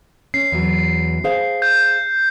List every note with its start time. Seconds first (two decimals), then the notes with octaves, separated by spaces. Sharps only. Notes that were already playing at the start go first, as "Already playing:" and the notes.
0.34 C#4 C7
0.52 E2 F#3
1.24 G#4 C5 F5
1.62 G6